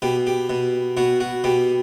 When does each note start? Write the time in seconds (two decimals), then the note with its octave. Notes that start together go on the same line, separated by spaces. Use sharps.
0.02 B2 G4
0.27 G4
0.49 B2
0.97 B2 F#4
1.20 F#4
1.44 B2 G4